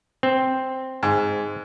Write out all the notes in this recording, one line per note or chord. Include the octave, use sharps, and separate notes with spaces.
C4
G#2